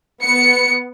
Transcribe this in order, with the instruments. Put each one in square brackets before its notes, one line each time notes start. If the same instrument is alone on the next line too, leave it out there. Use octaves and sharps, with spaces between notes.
[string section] B3 C#7